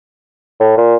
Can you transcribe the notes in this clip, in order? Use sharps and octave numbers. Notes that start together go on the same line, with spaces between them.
A2
A#2